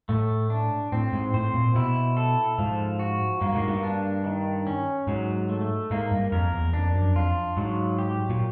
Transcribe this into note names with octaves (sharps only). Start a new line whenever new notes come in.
A2 A3
D4
A2 C4
G#2
A2 C5
A#2
B2 E4
A4
G#2 F3
F#4
G2 A#3
G#2
G2
D4
D#3
C#4
G#2 F#3
A3
G#2 A#3
G2
F2 A#4
E2
F2 D4
F#2
F2 F4
G#2 F#3
G4
A#2